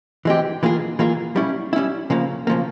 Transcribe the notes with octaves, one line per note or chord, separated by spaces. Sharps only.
E3 G#3 C4 G4
E3 A#3 F4 G#4
E3 A#3 F4 G#4
G3 C#4 E4
G3 C#4 E4
C#3 F3 A#3
C#3 F3 A#3